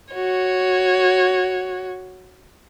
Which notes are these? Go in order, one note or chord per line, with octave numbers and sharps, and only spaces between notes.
F#4 C#5